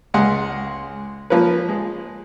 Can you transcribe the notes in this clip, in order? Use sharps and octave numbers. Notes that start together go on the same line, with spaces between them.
C#2 G#3 F#5 C6
F3 A#3 C#4 B4
G#3